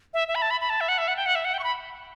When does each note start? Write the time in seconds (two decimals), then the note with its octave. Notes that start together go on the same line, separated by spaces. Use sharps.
0.14 E5
0.28 E5
0.35 B5
0.42 A5
0.50 B5
0.61 B5
0.70 A5
0.81 E5
0.89 F#5
0.98 E5
1.08 F#5
1.16 G5
1.26 F#5
1.35 E5
1.45 F#5
1.54 G5
1.59 C#6
1.64 B5